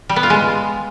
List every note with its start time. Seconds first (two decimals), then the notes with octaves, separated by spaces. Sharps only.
0.09 G3
0.16 B3
0.23 F4
0.30 G#3